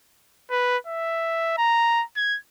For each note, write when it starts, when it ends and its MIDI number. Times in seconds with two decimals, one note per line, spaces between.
0.51 0.77 71
0.87 1.53 76
1.58 2.03 82
2.16 2.38 92